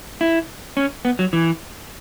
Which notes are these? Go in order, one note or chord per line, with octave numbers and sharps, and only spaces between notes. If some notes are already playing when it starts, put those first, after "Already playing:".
E4
C#4
B3
F#3
E3